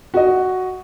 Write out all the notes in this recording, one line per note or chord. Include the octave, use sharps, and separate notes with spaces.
F#4 D#5